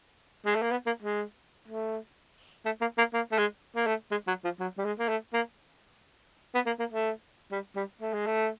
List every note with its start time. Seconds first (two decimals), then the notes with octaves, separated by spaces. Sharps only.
0.46 G#3
0.55 A3
0.62 A#3
0.71 B3
0.87 A#3
1.03 G#3
1.68 A3
2.65 A3
2.81 A#3
2.98 A#3
3.14 A#3
3.32 A3
3.38 G#3
3.76 A#3
3.87 A3
4.11 G#3
4.28 F#3
4.44 F3
4.60 F#3
4.78 G3
4.85 G#3
4.99 A#3
5.09 A3
5.34 A#3
6.55 B3
6.66 A#3
6.79 A#3
6.92 A3
7.52 G3
7.76 G3
8.02 A3
8.13 G#3
8.26 A3